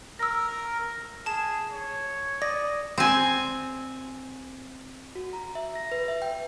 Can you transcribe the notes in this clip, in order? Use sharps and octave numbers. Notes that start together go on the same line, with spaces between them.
A#4 E6 A#6
G#4 A5 E7
C#5
D5 D#6 A#6
C4 G#5
F#4
A#5
E5
A#6
B4
E5
G5